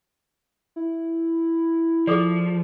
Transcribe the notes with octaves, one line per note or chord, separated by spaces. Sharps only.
E4
F3 G#4 A4 D5